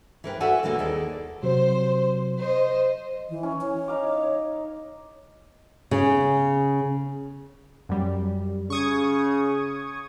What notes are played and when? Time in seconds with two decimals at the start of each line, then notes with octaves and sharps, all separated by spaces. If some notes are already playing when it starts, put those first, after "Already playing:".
0.24 E3 A#4 B4 G5
0.40 F#4 A4 D5 E5 F#5 G#5
0.63 D#2 C3 E3 A3 A#3 F#4
0.79 D#2 G#4 A4 D5
1.43 C3 F#3 C5
2.39 C5 D#5
3.30 E3
3.43 C#4
3.61 C#5
3.88 D#4 F5 D6
5.91 C#3
7.89 F#2 G3
8.70 C#3 C#6 D#6 G#6